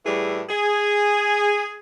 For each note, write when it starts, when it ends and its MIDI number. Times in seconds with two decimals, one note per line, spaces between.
0.05 0.43 45
0.05 0.43 52
0.05 0.43 55
0.05 0.43 68
0.50 1.78 68